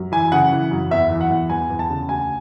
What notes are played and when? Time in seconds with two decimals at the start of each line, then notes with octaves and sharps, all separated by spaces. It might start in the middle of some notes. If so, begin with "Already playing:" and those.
Already playing: F#2
0.12 E3 G#5
0.32 C#3 F#5
0.52 E3
0.71 F#2
0.91 E2 E5
1.10 E3
1.21 F#5
1.30 E2
1.50 E2 G#5
1.70 E2
1.79 A5
1.90 C#3
2.09 D2 G#5